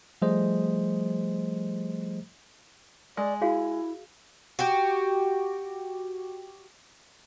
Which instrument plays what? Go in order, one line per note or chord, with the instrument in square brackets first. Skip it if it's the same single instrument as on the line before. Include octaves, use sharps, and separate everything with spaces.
[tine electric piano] F3 G3 A3 G#4 C5 D#5
[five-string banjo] G#3 [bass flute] D5
[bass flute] E4 [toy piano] F#4 G#4 F5
[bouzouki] F#4 G4